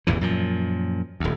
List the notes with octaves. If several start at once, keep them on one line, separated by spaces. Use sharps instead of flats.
E1 A1 E2 E3
F#2 A#2 F3
D#1 D2